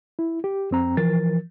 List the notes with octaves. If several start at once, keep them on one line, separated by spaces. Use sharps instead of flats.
E4
G4
F2 C4 A#5
E3 F3 A#4 A6